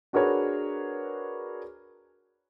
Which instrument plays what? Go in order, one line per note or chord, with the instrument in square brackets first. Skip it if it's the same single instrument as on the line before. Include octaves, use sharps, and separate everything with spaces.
[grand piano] D4 F#4 G#4 A#4 B4 C#5